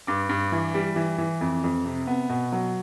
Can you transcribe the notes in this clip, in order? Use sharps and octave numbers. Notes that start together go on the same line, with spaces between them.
G2 D6
G2
E3
G3
E3
E3
F2
F2
C3
B3
B2
F#3